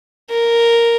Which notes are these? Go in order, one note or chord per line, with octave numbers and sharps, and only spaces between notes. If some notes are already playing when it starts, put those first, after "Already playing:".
A#4